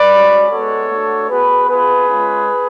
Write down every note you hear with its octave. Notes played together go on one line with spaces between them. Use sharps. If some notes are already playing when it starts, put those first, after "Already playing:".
Already playing: B4 D5
G#3 C#4 F#4
G#3 B3 F#4 A4 C#5
A3 D4 F#4
B3 F#4 G#4 B4
B3 F4 G#4 B4
G#3 C#4 F4